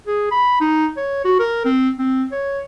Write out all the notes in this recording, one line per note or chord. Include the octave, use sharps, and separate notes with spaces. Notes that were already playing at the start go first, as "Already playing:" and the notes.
G#4
B5
D#4
C#5
F#4
A#4
C4
C4
C#5